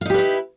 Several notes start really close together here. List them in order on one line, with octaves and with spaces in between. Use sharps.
F5 D#4 G4 B4 E4